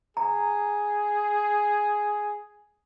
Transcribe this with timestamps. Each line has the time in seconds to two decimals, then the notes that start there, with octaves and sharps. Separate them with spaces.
0.17 G#4 A#5